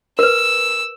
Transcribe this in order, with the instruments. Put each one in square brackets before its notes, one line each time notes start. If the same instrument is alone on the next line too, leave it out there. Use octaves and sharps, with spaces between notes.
[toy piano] A#4 B4 [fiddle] E6